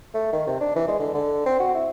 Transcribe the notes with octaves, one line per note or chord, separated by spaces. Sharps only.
A3
D#3
C3
D4
E3
G#3
D3
D3
C4
F#4
E4